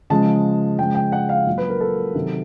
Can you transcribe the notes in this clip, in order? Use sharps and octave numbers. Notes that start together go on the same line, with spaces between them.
C#3 F3 G#3 A5
C#3 F3 G#3 G5
G5
F#5
F5
A#2 F#3
B4
A#4
A4
C3 D#3 F#3